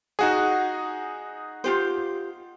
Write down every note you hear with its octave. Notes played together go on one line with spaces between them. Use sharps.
D#4 F#4 G#4 D#5 F#5
F4 G4 C5